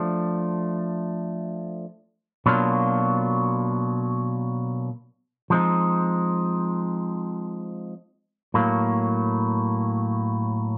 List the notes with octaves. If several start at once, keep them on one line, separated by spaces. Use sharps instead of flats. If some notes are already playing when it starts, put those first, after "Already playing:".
Already playing: F3 A3 D4
B2 F#3 A#3 D4 F4
F3 G#3 C4 D#4
A2 F#3 A#3